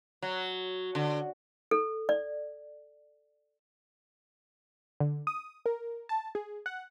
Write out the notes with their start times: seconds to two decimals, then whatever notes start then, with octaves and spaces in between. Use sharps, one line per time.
0.22 F#3
0.95 D3
1.71 A4
2.09 D5
5.00 D3
5.27 D#6
5.66 A#4
6.09 A5
6.35 G#4
6.66 F#5